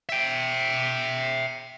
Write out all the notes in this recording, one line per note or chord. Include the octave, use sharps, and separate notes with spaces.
E5 G5